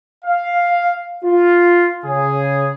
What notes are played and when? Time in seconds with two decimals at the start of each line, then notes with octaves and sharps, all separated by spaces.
0.25 F5
1.24 F4
2.05 C#3 G#4